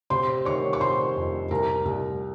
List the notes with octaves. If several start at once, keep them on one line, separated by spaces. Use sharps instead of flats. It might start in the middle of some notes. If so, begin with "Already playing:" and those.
C3 C5 C6
D#3 C#5 C#6
C#6
C3 C5 C6
F2
C2 A#4 A#5
C2